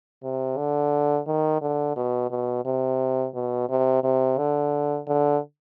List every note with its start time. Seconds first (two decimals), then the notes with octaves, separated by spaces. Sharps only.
0.23 C3
0.57 D3
1.27 D#3
1.61 D3
1.96 B2
2.30 B2
2.65 C3
3.34 B2
3.69 C3
4.03 C3
4.38 D3
5.07 D3